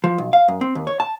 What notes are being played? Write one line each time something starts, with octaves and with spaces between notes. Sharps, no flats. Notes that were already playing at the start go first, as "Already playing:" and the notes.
F3
B1
F5
F#2
C4
D#2
C#5
A5